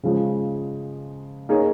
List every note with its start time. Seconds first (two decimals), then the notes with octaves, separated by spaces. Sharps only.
0.03 C#3 F3 G#3
1.49 A#3 D#4 G#4 C#5